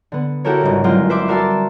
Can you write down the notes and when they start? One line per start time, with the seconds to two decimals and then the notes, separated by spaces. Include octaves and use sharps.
0.12 D3 B3
0.45 E4 F#4 G4 A4 A#4 C#5
0.61 G1 G#2 C#3
0.84 G1 F#3 G#3 C4 F4
1.09 B4 C5 E5 C6 D6
1.28 F#4 A#4 D5 A5 C6 E6